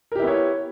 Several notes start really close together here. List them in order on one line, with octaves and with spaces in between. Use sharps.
A#4 G4 E4 B3 C#5